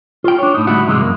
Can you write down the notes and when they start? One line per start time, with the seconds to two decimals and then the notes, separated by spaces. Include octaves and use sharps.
0.24 F4 G5
0.38 D4 C#5
0.54 A2 D#4
0.67 D2 A2 G3 E4 F#4 F#5
0.87 G#2 C3 E3 G#3
1.01 F#2 A#3